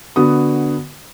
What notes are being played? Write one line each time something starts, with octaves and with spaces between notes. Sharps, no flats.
D3 B3 F#4 D#6